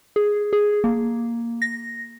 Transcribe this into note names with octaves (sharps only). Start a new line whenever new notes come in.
G#4
G#4
A#3
A#6